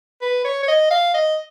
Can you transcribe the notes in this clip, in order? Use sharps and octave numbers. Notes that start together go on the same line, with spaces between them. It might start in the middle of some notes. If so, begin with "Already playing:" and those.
B4
C#5
C#5
D#5
F5
D#5